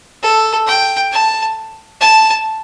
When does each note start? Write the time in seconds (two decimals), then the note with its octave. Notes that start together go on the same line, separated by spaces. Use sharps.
0.23 A4
0.67 G5
1.12 A5
2.01 A5